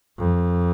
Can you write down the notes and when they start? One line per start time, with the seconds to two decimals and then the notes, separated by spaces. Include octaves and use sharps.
0.18 F2